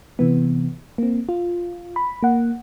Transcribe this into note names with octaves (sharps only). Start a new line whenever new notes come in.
C3 E3 B3
A#3 C4
F4
B5
A#3 F#5